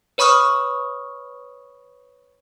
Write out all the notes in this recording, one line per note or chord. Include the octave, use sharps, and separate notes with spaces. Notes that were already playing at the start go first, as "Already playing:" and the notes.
B4 C#5 B5 C#6 D#6 F6